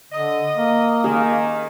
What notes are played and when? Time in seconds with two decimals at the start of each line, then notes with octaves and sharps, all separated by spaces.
0.12 D3 D#5
0.57 A#3
1.04 D#3 G#4